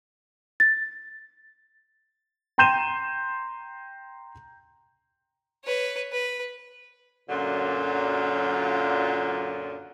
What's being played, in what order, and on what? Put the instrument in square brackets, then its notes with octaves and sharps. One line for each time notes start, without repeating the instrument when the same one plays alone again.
[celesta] A6
[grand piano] G5 A#5 C6 G6 D#7 E7
[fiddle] B4 C#5
B4
[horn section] F#2 A#2 D3 F#3 F4